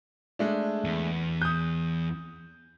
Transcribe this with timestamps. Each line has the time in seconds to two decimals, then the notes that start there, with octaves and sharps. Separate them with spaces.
0.39 G#3 A3 D4
0.84 E2
1.42 D#6 G6